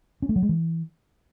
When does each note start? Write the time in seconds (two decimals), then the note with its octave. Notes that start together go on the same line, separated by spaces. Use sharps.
0.22 C#4
0.29 A3
0.36 F#3
0.42 G#3
0.49 E3